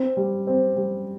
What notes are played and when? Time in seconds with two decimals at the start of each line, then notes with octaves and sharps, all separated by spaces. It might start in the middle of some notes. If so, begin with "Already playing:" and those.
Already playing: C4
0.17 G3
0.47 C4
0.76 G3